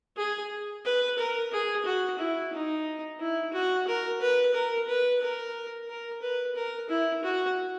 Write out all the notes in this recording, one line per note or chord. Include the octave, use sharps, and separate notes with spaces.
G#4
B4
A#4
G#4
F#4
E4
D#4
E4
F#4
A#4
B4
A#4
B4
A#4
A#4
B4
A#4
E4
F#4